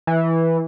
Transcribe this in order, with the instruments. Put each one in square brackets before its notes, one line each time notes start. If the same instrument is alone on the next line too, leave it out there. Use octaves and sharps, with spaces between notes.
[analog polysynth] E3